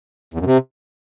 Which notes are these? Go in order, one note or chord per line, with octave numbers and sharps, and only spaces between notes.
E2
F#2
C3